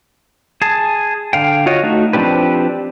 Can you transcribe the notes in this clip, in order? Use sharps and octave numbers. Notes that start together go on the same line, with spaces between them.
G#4 A5
D3 F5 G5
F4 F#4 C#5 D#5
A3 D#4 F#4
F3 C4 D4 G4 B4